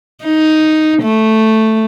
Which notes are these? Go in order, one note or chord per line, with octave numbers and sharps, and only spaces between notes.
D#4
A3